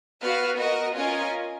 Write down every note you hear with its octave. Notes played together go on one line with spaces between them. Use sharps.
B3 F#4 B4 F5
F#4 A#4 D#5
C#4 F4 A#4 D#5 G#5